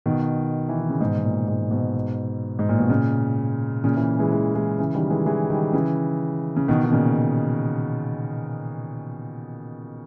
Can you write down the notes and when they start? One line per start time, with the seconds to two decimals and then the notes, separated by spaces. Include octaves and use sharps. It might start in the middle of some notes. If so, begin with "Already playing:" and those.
0.06 B2 D#3
0.69 E3
0.79 D#3
0.90 C#3
1.00 G#2 B2
1.18 B2
1.24 A#2
1.48 G#2
1.71 G#2 B2
2.59 G#2
2.69 A#2
2.79 B2
2.89 A#2 C#3
3.84 A#2 C#3
3.96 C#3 E3
4.19 E3 G#3
4.31 E3 G#3
4.55 E3 G#3
4.79 C#3 E3
4.94 D#3 G3
5.10 E3 G#3
5.26 E3 G#3
5.50 D#3 G3
5.73 C#3 E3
6.56 C#3
6.68 B2 D#3
6.85 D#3
6.92 A#2 C#3